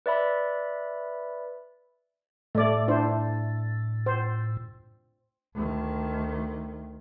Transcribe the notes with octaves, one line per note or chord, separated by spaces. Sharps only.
B4 D5 E5 B5
A2 A3 D5
D4 E4 C5
C5
D2 D#3